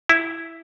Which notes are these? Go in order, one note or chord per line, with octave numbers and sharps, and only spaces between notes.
E4